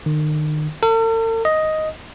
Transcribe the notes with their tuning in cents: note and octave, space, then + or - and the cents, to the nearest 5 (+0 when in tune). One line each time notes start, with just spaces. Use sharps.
D#3 -35
A4 +45
D#5 +5